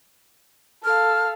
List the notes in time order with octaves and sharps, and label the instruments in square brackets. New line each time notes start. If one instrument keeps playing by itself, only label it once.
[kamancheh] A4 F5 [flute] F6